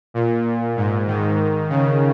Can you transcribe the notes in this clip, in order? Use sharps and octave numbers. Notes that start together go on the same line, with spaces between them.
A#2
G#2
D#3
C#3